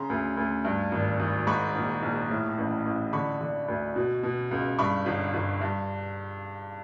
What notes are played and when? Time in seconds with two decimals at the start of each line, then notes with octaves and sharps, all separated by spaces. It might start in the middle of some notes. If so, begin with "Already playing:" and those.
Already playing: C#3 A#5 C6
0.10 D2
0.37 D2
0.65 G2
0.92 G#1
1.20 G#1
1.47 G#2 B5 C#6
1.75 A#1
2.03 A#1
2.30 A2
2.58 A1
2.85 A1
3.13 D3 B5 C#6
3.41 D3
3.68 D2
3.96 B2
4.23 B2
4.51 C#2
4.79 G2 B5 C#6
5.06 G1
5.34 G1
5.61 G2